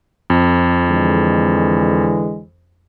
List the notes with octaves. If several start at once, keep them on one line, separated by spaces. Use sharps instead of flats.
F2
D3 E3 G#3